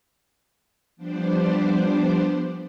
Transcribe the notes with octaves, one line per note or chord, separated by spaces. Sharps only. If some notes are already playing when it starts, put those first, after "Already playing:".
F3 G3 B3 D4 C5 D5